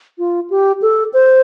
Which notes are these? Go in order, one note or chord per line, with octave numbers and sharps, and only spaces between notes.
F4
G4
A4
C5